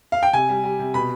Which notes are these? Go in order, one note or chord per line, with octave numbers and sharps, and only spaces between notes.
F5
G5
C3 G#5
G3
G3
C3
B2 B5